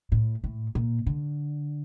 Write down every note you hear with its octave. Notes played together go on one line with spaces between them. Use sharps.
A2
A2
A#2
D3